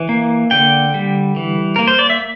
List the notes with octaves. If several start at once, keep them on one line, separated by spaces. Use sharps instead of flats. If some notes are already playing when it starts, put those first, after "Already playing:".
Already playing: E3
A#3
D3 G5
G3
E3
A#3 A#4
C5
D5
E5